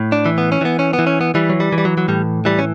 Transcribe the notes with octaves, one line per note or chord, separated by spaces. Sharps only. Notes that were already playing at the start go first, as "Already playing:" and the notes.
Already playing: A2
D4
E3
B3
C#4
E3 B3
C#4
B3
E3
C#4
B3
E3 G3
F#3
G3
E3
G3
F#3
F#3
A2 G3
E3 G3
C#4